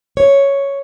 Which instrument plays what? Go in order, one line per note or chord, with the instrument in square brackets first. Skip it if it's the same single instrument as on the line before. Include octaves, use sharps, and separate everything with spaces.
[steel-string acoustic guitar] C#5